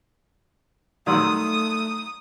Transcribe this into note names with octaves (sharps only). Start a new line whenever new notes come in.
D#3 F#3 G3 A3 D5 C6 D#6 E6